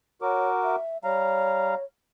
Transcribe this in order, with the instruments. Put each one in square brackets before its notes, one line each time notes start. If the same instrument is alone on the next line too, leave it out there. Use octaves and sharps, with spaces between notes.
[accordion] F#4 A#4 D6 [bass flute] C#5
[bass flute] E5
[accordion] G3 F5 A#5 [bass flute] C#5